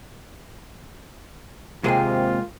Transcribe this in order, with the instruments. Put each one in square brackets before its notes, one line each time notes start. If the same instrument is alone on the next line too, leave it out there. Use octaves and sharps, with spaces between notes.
[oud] D#2 C3 [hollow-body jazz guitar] G#3 A#3 G#4 [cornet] F4